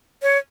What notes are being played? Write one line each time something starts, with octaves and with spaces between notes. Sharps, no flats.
C#5